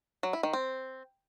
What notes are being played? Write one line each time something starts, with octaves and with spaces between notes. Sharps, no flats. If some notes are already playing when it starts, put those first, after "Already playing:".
F#3
E4
D#3
C4